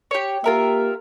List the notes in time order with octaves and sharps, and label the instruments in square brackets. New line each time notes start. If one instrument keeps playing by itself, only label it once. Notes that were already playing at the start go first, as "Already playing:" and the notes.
[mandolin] G4 C#5
[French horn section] A#3 G4 [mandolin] F4 A#4 E5